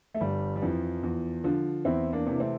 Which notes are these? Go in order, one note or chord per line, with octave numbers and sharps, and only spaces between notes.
A3
G1 G3
G3
F2 E3 F3
E2
D3 F3
E2 C4 E4
A#3 D4
C3 E3
A3 C4